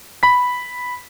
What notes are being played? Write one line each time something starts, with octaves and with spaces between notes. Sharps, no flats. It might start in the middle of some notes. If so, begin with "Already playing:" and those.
B5 B6